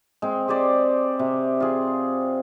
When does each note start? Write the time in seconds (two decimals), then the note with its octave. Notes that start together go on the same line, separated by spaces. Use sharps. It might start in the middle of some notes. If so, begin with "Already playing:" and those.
0.22 G#3 C4
0.48 G4 G#4 C5 D5
1.19 C3
1.60 F4 G#4